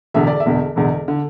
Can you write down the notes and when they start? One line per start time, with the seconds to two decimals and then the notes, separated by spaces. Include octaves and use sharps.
0.14 E1 E2 D3 E5
0.27 D5
0.40 E5
0.46 E1 E2 D3
0.76 E1 E2 D3
1.08 D3